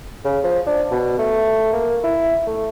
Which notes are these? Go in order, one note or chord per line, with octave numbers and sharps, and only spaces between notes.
C#3
F3
D4
B2
A3
A#3
E4
A3